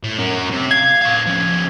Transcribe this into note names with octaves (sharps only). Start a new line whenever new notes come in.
A2
C#4 A#4
C3
F5 G#6
D4 F5
F3 C#4